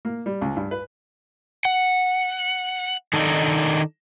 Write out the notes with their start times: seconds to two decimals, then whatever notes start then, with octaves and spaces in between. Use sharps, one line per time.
0.05 A#3
0.26 G3
0.41 C#2
0.56 G2
0.71 B4
1.65 F#5
3.13 D#3 D4 D#4 A4